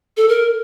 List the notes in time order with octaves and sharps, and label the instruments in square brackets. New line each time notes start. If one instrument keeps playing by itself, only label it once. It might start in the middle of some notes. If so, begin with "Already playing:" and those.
[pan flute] A4
A#4